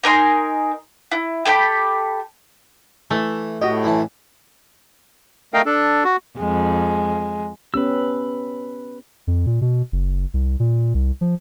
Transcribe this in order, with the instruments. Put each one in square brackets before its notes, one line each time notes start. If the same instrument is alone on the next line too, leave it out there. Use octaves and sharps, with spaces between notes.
[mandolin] D#4 A#4 G#5 C6
E4
G4 A4 G5 B5
[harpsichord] E3 [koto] A3
[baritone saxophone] A2 [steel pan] F#4 D#5 [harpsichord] G4
[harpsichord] F#2 E3 A5
[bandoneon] A3 A#4 D#5 F5 G5
D4 A4
F#4
[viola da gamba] F2 [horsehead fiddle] G#3
[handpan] B3 C#4 G4 [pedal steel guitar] B4 E6
[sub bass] F2
A#2
B2
F#1
C2
A#2
C2
F3